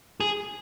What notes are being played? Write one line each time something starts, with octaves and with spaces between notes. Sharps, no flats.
G#4